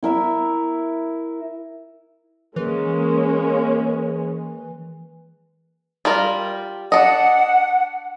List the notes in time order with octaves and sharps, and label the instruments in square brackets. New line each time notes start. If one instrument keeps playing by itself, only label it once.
[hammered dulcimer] E4 A#4 E5
[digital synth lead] E3 [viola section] G#3 A#3 C#4
[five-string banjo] G3 F4 A#4
[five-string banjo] D4 D#5 [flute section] F#5